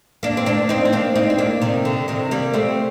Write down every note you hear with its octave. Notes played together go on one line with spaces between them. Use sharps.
A#3 D4
C4
A#3 D4
C4 D#4
C4
A#3 D4
C4 D#4
C4
A#3 D4
C3 D#3
D3
C3 D#3
G3 A#3
A3 C4